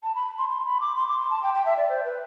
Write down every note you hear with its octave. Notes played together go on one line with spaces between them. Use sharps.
A5
B5
C6
C6
B5
D6
C6
D6
C6
A5
G5
G5
E5
D5
C5
B4